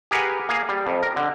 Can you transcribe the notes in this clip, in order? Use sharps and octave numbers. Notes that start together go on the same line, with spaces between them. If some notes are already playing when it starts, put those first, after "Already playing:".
G4 G#4 A#4 B4 F#5 G#5
A#3 G#4 F5
G3
F2
A#4
D3